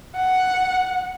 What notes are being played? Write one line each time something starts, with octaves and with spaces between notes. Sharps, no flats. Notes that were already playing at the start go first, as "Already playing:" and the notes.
F#5